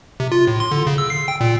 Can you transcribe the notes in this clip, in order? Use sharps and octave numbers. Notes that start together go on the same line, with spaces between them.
C3
F4
A2
C6
D3
C#3
E6
C7
G5
A#2